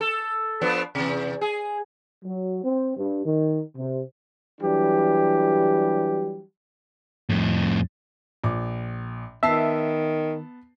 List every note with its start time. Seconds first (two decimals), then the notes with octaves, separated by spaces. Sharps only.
0.01 A4
0.61 F3 B3 D4
0.95 E2 C3
1.41 G#4
2.24 F#3
2.64 C4
2.97 G2
3.25 D#3
3.77 C3
4.60 E3 F#3 G3 D4 G4
7.29 F2 A2
8.44 A#1 D6
9.43 D#3 B3 E5 A5 C7